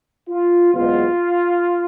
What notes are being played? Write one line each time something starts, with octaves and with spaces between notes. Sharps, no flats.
F4
F#1 E2 B2 G#3 F4